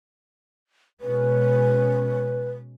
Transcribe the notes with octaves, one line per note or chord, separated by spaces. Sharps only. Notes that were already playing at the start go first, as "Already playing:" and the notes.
B2 G#3 C#4 B4